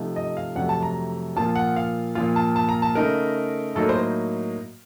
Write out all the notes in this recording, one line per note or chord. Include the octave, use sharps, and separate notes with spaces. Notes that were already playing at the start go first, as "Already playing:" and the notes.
Already playing: C3 F3 A3 D#4
D#5
F5
F2 C3 F#3 A3 F#5
A5
A#5
A#2 F3 A#3 F4 A5
F#5
F5
A#2 F3 A#3 F4 F5
A5
A5
A#5
A5
C#3 A3 D#4 A#4
A2 F#3 A#3 D#4 A4
C5